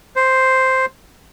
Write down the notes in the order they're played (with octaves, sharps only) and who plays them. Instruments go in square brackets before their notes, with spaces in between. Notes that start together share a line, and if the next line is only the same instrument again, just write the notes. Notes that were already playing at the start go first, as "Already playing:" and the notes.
[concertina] C5